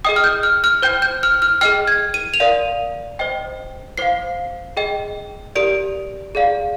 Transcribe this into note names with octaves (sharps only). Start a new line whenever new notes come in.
G#4 D#5 G5 D#6
F6
G6
F6
F6
C5 G5 G6
G6
F6
F6
G#4 D#5 G5 F6
G#6
D#7
F7
A#4 D5 F5 D#7
C5 D#5 G5
C5 F5 C7
G#4 D#5 G5
G4 A#4 D5 D7
G#4 D5 F5